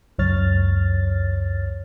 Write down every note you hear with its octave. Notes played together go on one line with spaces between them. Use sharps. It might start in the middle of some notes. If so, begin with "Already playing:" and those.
C#2 F#2 C#5 F6 A6